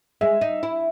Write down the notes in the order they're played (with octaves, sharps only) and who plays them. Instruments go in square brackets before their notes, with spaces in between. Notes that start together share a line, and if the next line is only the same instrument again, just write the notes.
[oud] G#3 [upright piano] E5
[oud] D#4
E4